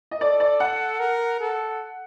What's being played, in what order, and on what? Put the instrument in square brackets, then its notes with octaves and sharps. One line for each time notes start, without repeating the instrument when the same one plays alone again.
[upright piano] D#5
[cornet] A4 [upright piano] D5
[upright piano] D5
F#5
[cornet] A#4
A4